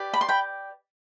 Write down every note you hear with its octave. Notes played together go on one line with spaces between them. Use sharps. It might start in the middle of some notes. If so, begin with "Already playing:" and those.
Already playing: G4 B4 D5
B5
C6
G5 B5